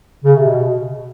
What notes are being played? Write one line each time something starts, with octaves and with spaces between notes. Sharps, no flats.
C#3
C3
B2